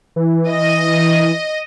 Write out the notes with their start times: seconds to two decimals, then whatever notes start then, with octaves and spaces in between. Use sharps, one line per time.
0.16 E3
0.50 D#5